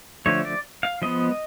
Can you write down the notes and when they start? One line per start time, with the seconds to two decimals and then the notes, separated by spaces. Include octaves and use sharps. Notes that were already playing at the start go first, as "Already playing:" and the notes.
0.26 D3 F3 A3 C#5
0.45 D5
0.83 F5
1.02 F3 G#3 B3 D#5